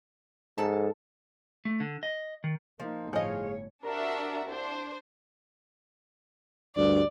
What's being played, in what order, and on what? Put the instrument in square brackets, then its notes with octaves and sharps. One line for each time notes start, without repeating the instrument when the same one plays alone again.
[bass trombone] G#2 [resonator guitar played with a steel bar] F3 A4 A5
[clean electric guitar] A3
D3
D#5
D#3
[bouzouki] F3 [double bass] A#3 D#4
[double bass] G1 [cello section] A2 C#5 [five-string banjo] F3 D#5 [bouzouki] G#4 F5
[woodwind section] C2 A#4 [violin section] D4 F#4 E5
[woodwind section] C2 [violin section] D4 C5
[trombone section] D2 G2 [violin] D5